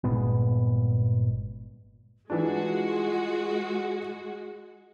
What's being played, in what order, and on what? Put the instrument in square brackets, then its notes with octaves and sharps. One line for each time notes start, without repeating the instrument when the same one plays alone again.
[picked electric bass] G1 A#2 G#3 B3
[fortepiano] E3 D4 [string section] G#3 F#4 [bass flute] F4